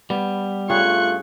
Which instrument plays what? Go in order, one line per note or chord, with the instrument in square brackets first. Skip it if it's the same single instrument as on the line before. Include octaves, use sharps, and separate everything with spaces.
[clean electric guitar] G3 [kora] B3
[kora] G2 C#4 G#4 [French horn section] A3 F4 [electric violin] C#6 F#6